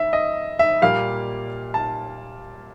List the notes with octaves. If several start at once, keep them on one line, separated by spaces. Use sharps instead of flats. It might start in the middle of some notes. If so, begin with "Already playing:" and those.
Already playing: E5
D#5
E5
A#2 G3 A#3 F5
A5